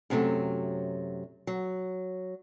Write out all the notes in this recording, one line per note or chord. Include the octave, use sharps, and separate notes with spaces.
F#2 C3 F#3 A3
F#3